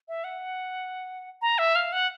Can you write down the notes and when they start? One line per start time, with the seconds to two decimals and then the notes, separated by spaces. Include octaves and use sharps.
0.08 E5
0.24 F#5
1.42 A#5
1.58 E5
1.75 F5
1.92 F#5